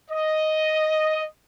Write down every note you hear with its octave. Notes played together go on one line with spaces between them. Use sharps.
D#5